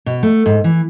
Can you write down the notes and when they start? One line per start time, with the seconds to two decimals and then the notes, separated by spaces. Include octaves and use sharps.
0.06 B2
0.23 A3
0.46 G#2
0.64 E3